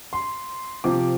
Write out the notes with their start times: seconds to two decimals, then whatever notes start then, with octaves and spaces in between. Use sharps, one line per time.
0.13 C6
0.84 C3 F3 C4 D6